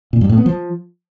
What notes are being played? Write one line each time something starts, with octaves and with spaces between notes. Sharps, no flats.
A#2
G2
A2
B3
F3